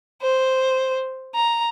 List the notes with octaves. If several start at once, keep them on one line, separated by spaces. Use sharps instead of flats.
C5
A#5